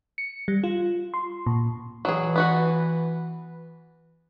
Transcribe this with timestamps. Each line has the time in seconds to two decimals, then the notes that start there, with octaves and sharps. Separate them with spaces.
0.18 C#7
0.48 G3
0.64 F4
1.14 C6
1.46 A#2
2.05 E3 F#3 G#4
2.36 B3 F#4 F#5